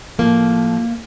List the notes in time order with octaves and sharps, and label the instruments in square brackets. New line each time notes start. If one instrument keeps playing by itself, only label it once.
[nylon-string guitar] A2 F3 A#3